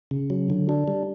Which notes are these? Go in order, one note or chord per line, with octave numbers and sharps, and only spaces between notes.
C#3
F#3
D3
D4
G3